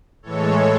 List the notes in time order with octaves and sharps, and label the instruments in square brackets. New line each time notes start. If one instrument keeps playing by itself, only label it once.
[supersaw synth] A2 E3 G#3 A4 C#5